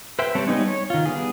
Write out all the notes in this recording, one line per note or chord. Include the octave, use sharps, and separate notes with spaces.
B4 C5 E5 G5
G3 C4 C#5 A5
G3 G#3 B3 D#4 C#5
C#5
D#3 F4
G3 B3 G#4